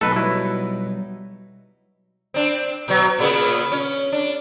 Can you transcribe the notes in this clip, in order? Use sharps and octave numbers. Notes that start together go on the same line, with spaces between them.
B2 F#3 A3 D#4 A4 B4
F#3 G3 E4
C4 D4
B2 F#3
A#2 C#3 B3
C#4
D4